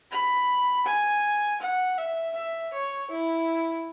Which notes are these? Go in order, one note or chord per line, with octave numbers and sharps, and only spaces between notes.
B5
G#5
F#5
E5
E5
C#5
E4